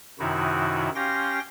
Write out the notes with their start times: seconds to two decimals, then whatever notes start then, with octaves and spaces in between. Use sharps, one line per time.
0.19 F#2 C3 D#3 D#4 E4 F#4
0.95 C#4 G4 F5 G5 C6 A#6